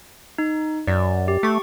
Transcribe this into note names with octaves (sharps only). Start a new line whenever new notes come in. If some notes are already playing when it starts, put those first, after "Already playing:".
D#4
F#2 D5
G4
A3 C#6 D6